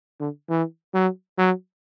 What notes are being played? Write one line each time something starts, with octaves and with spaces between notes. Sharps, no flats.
D3
E3
F#3
F#3